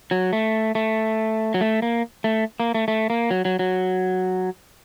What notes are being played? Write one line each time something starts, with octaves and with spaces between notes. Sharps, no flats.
F#3
A3
A3
F#3
A3
A#3
A3
A#3
A3
A3
A#3
F#3
F#3
F#3